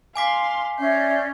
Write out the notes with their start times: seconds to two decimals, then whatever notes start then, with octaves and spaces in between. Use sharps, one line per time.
0.16 F5 G#5 C6 D6 B6
0.79 C#4 D5 E5 G6 C7